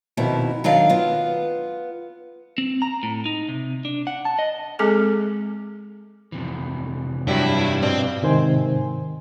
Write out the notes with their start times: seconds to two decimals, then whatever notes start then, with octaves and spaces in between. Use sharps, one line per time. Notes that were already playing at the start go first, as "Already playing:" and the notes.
0.17 F2 B2 D#3 E4
0.64 D#3 F#3 D4 F5
0.89 B3 F4
2.58 C4
2.82 A#5
3.03 A2
3.26 D#4
3.49 C3
3.85 D4
4.07 F#5
4.25 A5
4.39 D#5
4.79 G#3 C4 G#4 A4 G#5 D6
6.32 F2 C3 E3
7.28 G2 F#3 G3 E4
7.82 B2 C4 D4
8.22 G#2 C3 D#3 C5 G#5